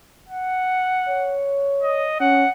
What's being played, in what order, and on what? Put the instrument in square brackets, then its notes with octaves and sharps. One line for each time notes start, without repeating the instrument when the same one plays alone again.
[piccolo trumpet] F#5
[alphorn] C#5
[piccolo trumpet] D#5
[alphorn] C#4 [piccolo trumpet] F#5